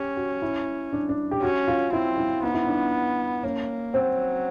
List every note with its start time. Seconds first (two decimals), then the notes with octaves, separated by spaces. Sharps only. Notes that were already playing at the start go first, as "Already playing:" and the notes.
Already playing: C#4 G4
0.17 F#4
0.42 E4
0.93 D4
1.09 D4
1.31 G4
1.42 C#4 F#4
1.68 F4
1.92 C4 E4
2.17 E4
2.43 B3 D#4
2.54 E4
2.61 D#4
2.68 D4
3.43 A#3 C#4
3.94 F#3 C4